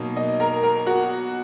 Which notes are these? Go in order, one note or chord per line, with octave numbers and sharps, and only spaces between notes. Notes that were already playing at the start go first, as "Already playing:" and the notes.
Already playing: B2 F#3 A#3 D#4
D#5
A#4 A#5
A#4 A#5
F#4 F#5